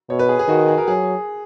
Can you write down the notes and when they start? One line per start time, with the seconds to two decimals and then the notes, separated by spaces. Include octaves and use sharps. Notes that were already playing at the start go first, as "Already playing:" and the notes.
0.10 B2 C#5
0.19 B4
0.29 G#4
0.39 G#4
0.48 D#3 F#4
0.69 G#4
0.78 A#4
0.88 F#3 G#4